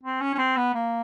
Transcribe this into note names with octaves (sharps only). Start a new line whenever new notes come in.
C4
C#4
C#4
C4
B3
A#3